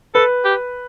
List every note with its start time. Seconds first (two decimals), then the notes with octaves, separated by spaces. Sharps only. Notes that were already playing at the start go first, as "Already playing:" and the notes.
0.15 A4 B4
0.45 G4